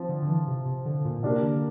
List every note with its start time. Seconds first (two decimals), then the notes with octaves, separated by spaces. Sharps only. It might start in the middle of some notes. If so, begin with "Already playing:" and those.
Already playing: F3 C4
0.09 D3
0.22 D3
0.28 E3
0.47 C3
0.66 C3
0.86 D3
1.05 A#2
1.17 A#2
1.23 C3 A#3 D4 G4 A#4
1.43 D3